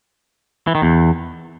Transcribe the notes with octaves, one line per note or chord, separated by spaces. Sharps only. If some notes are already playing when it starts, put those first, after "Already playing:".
E3
D#3
E2